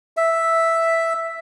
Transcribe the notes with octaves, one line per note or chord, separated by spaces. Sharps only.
E5